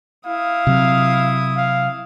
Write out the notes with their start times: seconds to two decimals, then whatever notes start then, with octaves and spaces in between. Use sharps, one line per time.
0.26 E4 F5 D#6
0.67 C3 F#3
1.56 F5